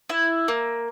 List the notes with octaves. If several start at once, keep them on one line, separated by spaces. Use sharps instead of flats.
E4
A#3